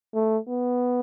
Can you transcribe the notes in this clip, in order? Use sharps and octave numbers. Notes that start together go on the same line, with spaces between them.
A3
B3